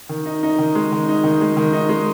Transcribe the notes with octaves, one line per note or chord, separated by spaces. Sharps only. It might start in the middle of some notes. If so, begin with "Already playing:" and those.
D#3
D#4
D#4
D#3
G#3
D#3
D#4
D#3
G#3
D#3
D#4
G#3